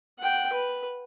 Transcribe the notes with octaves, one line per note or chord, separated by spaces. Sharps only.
F#5 G5
B4